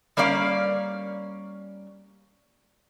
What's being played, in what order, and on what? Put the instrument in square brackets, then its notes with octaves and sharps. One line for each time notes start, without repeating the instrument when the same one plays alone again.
[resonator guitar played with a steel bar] G3 A#3 C#4 D5 F5